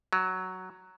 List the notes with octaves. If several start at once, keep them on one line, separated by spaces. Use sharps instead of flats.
F#3